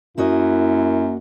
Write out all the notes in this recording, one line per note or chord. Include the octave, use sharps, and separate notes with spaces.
F#2 A#3 E4 F#4 D#5